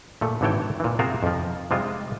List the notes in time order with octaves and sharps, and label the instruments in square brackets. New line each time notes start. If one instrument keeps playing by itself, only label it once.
[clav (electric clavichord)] A#2 A3
G#1 D3 E3 A4 C#5 G5
A#2 E3
C3 F4 F#4 G#4 A#4 C5
F2 F3
C3 G3 G#3 C4 F4